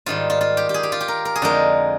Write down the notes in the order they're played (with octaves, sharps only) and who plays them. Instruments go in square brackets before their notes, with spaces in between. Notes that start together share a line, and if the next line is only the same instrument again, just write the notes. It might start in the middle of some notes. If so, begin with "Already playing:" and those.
[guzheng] G#2 D#3 G3 F4
F4
F4
G4
G4
G#4
G4
F4
G4
A#4
A#4
G#4
F2 D3 G#3 D#4 A#4